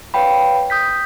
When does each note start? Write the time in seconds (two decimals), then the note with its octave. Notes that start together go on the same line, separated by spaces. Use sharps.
0.14 B4 C#5 F5 G5 B5
0.70 D#6 G6 B6